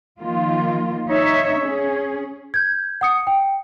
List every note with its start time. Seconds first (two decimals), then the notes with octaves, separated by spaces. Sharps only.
0.19 D#3 F3 A#3 F4
1.07 D#4 C#5 E5
1.60 C#4 G#4
2.54 G6 G#6
3.01 F#5 D#6 C#7
3.27 G5